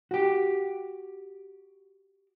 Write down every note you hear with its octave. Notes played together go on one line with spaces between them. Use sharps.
F#4 G4